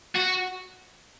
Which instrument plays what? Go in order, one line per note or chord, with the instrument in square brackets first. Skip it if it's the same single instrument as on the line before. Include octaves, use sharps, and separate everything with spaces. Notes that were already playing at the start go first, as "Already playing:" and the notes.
[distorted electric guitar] F#4